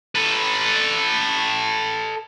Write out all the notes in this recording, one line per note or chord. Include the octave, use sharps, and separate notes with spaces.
A4 B4